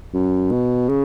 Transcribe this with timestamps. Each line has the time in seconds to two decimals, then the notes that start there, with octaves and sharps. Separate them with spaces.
0.14 F#2
0.52 B2
0.89 C#3